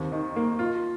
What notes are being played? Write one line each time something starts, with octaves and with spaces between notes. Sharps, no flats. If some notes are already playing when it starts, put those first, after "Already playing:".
Already playing: D#2 C4
D#3
A#3
F4